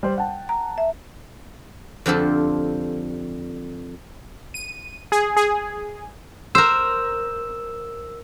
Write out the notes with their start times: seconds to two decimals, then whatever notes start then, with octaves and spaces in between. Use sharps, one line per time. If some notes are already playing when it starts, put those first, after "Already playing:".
0.03 G3 C5
0.18 F#5 G5 A5
0.49 A#5
0.78 E5
2.06 F2 D3 F3 C4 G4 A4
4.54 D#7
5.12 G#4
5.37 G#4
6.55 A#4 C5 E6